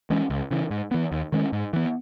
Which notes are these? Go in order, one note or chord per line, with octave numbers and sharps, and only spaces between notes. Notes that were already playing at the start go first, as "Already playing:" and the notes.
E3 G#3 C#4
C#2
C#3 E3
G#2
E3 B3
D#2
D#3 G#3 C#4
G#2
E3 B3